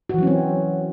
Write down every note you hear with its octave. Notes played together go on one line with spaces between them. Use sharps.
E3 F#3 C4 C#4 F#4